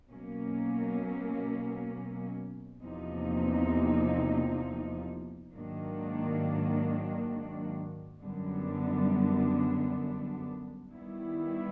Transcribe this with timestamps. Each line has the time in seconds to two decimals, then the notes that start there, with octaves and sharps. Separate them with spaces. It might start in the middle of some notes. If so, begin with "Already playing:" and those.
0.10 B2 F#3 A#3 C#4
2.82 E2 C3 F3 A#3 D#4
5.52 G#2 D#3 F#3 A#3 D4
8.23 F#2 D3 G3 B3 D4
10.94 D#3 G3 B3 E4